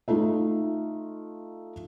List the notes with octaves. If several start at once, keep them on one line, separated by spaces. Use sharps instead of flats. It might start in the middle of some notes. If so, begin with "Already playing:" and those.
A3 D#4 F4 A4 E5